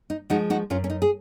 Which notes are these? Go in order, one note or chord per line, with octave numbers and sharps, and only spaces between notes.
D#4
F3 G#3 D#4 F#4
D#4 F#4
F#2 C#4 F4
C#4
D#4
G#4